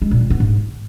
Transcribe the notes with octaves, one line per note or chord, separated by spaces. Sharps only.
G#3
A#2
D#3
B3
G#2